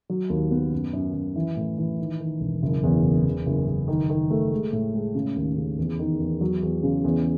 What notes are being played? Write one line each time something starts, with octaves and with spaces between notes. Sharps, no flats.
F#3
D#2
B3
F#2
F#2
F#2
E3
A2
E3
D#3
D#3
E1
F#1
E2
F#1
E2
F#1
F#1
D#3
D#3
A3
G#3
A2
G#3
C#3
D#2
C#3
E2
D#3
E2
F#3
E2
C#3
E2